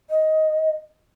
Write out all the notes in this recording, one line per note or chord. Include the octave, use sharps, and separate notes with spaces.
D#5